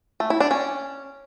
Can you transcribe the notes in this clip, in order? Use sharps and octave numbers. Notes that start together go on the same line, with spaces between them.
A3
E4
D4
C#4